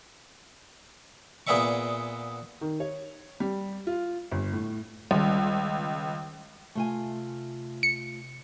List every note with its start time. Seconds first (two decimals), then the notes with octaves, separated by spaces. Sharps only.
1.47 A#2 B3 G#4 D5 E5 C#6
2.61 D#3
2.80 C#5
3.40 G3
3.87 F4
4.31 G1
4.53 A2
5.11 C#2 D#3 G3
6.75 C3 A3 F4 G#5
7.83 C#7